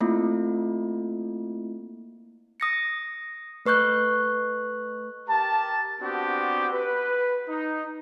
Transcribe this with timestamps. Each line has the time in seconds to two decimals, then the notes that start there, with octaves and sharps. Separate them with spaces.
0.01 A3 A#3 C4 E4 F4
2.60 D#6 A#6 C#7
3.66 A3 B4 C#6 F#6 G6
5.28 G4 A#4 A5
6.01 B3 C4 D4 F#4 G4
6.73 B4
7.48 D#4